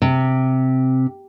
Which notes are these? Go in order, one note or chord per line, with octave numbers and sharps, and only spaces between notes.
C3